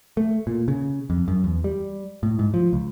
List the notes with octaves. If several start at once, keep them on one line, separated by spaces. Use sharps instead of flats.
A3
A#2
C#3
F2
F#2
E2
G3
A2
G#2
F3
C#2